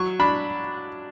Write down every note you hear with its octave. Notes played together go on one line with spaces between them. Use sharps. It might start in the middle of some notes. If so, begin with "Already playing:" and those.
Already playing: F#3 C#6
D4 B5